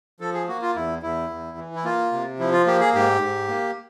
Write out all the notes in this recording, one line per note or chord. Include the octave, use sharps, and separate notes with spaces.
F3 A4
G#4
A#3 F#4
F4
E2 E4
E2 E4
E2
E3
E4
A#3 F4
C3
F3 E4
F4
A#3 G4
G#4
G#2 G4
G#2
A#3